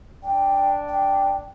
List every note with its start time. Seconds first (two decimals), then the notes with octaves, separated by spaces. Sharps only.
0.23 D4 G5
0.88 G5